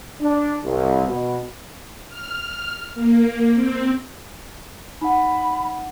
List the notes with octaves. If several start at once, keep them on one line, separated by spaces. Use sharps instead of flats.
D4
C2
B2
F6
A#3
C4
D#4 F#5 B5